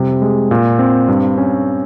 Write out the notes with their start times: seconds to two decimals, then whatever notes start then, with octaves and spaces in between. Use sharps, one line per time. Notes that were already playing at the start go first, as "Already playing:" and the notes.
Already playing: F2 C3 G3
0.22 G#3
0.51 A#2
0.79 C4
1.08 G2
1.38 C#4